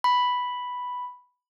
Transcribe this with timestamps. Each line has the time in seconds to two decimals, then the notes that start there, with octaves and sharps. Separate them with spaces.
0.04 B5